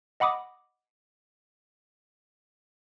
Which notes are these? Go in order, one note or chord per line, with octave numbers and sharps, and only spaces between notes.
D#5 F#5 B5 D6 D#6